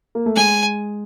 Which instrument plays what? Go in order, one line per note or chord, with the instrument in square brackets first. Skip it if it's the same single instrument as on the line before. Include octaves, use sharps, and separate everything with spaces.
[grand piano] A#3
A3
[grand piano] G#3 [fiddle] G#5